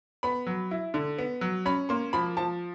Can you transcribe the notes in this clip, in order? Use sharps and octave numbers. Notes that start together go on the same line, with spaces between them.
B3 B5
F#3
E4
D3
B3
F#3
C#4 B5
A#3 C6
F3 B5
F3 A5